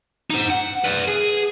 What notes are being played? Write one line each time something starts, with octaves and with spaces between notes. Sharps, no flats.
D#4 C5
F#5
B4 D5
G#4